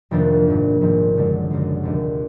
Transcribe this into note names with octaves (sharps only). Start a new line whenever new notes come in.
F1 F2 D#3 A#3 D4
A#1 G#2 D#3
A#1 G#2 D#3
F#1 F#2 D3 G#3
F#1 F#2 D3 G#3
F1 D#2 D3